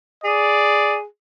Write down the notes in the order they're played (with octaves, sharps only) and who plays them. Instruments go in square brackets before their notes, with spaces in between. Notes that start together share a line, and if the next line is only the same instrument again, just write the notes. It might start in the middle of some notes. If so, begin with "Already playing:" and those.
[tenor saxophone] G#4 [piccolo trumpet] D5